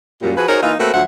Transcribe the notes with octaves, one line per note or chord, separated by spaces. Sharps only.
F#2 A#2 G3
F3 F#4 G#4 B4
D#4 F#4 G#4 A#4 C5 C#5
E3 A#3 D#4 F4
A3 A#3 C4 F#4 A#4 B4
D2 F3 F#3 C5 E5 F#5